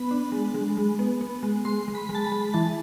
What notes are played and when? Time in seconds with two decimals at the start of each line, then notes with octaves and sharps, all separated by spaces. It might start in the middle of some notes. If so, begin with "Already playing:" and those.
Already playing: B3 B5
0.11 D4
0.32 G#3
0.54 G#3
0.77 G#3
0.99 B3
1.21 B3
1.43 G#3
1.65 G#3 C6
1.88 G#3
1.95 B5
2.09 G#3
2.15 A5
2.24 B5
2.32 G#3
2.54 E3 A5